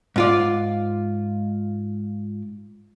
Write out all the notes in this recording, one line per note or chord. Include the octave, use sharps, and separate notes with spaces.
G#2 F4 D5